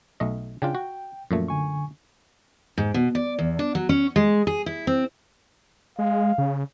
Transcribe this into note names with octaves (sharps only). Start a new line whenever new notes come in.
B1 A3 D#5
C#3 D4 F4 G5
F#4
F#2 A#2 F3 A3
D3 G#5 C#6
G#2
B2
D5
E2
D4
F#3
C#4
G#3
G#4
E4
C4
G#3 F5
C#3